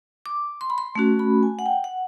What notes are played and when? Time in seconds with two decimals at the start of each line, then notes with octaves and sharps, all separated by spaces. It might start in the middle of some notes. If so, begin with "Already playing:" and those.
0.26 D6
0.61 C6
0.70 B5
0.78 C6
0.95 A3 C#4 F#4
1.19 B5
1.43 G#5
1.59 F#5
1.66 G5
1.84 F#5